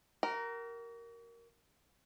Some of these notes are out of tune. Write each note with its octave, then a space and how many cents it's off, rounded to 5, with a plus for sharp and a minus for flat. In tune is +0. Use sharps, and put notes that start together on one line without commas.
F#4 +45 A#4 +0